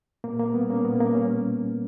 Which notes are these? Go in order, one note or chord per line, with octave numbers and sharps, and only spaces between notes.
A#2 A#3
A#3
G3 B3
A#3 C#4
A#2 B3
A#3
G3 C#4